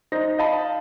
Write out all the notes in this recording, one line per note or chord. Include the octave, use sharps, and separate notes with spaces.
D#4 C5 A#6
D#5 F5 A5 B5